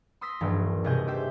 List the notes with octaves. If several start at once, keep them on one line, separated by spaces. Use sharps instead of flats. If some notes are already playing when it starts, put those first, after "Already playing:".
C6 D#6 E6 A#6 B6
D#1 A#1 G2 A#2 E3
E1 C3 G#4 D#5 G6
G4 C5 E5 G5 G6